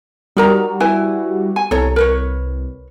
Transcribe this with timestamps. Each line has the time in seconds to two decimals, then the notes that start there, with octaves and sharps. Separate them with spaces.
0.37 G3 D#4 F#4 A#4 A#5
0.80 E4 B4 G#5
1.56 G#5
1.71 C2 A4 C#5 A#5
1.96 A#4 B4 C#5